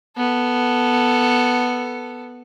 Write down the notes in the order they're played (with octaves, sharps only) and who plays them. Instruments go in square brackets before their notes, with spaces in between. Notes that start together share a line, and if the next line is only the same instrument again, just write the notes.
[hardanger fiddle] B3 A4